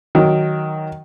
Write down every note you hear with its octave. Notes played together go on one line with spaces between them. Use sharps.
D#3 F#3